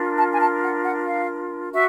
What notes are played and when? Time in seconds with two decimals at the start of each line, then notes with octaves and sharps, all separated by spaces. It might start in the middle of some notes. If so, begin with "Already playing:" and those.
Already playing: D4 F4 A#4
0.16 A5
0.33 G#5
0.39 A5
0.62 F#5
0.83 F#5
1.06 F5
1.73 F#4 E5